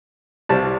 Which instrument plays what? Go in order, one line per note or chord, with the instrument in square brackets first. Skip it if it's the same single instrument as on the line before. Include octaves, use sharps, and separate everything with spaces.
[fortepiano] C2 C3 G3 A5